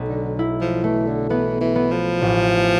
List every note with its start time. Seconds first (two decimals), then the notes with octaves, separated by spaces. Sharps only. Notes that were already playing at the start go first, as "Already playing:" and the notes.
Already playing: B1 A3
0.08 D3
0.39 E4
0.61 F3
0.84 E3 A3
1.07 D3
1.30 E3 B3
1.61 E3
1.75 B3
1.91 F3
2.21 A1